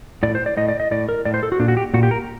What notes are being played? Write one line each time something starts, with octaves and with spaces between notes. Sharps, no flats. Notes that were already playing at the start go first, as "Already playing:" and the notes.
A2 D5
C5
D5
A2 D#5
D5
D#5
A2 D5
A#4
A2 D5
C5
A4
F#4
A#2 D4
F#4
G4
A#2 F#4
G4
A#4